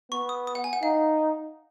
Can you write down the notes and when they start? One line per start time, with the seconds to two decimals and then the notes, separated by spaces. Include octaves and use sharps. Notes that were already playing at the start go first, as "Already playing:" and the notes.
0.12 B3 C#6
0.29 D#6
0.47 D#6
0.55 F#5
0.64 G#5
0.73 F#5
0.82 D#4 F5